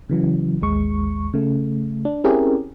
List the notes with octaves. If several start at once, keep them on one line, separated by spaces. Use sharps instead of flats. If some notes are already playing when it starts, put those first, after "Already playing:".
C#3 E3 F#3
A1 D#2 G#3 C#6
C#3 A3
D4
C4 C#4 E4 G4 G#4 A#4